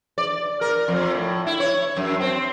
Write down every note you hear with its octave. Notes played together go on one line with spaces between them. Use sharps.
D5
A#4
F2
A2
E4
C#5
F#2
C4